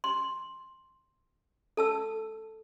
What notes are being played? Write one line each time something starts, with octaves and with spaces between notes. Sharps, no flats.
C6
A4 A5 E6